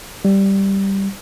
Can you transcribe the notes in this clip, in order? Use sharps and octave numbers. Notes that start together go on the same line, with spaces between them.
G3